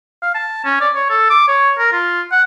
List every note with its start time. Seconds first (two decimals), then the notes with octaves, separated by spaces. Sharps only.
0.22 F5
0.35 A5
0.65 C#4
0.81 D5
0.95 C#5
1.10 A4
1.30 D6
1.48 C#5
1.78 A#4
1.92 F4
2.32 F#5